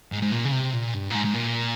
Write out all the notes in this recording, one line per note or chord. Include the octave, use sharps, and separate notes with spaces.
G#2
G#2
A#2
C#3
C3
A#2
G2
A#2
G#2
G#2
A#2